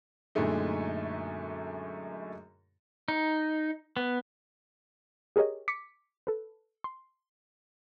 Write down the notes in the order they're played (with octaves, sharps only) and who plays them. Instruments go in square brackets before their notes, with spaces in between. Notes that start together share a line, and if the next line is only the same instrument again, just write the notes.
[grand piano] F#2 A#2 D3 G#3 A3 D#4
[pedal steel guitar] D#4
B3
[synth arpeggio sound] G4 G#4 A#4 C#5 D#5
D6 B6 C#7
A4 B4
C6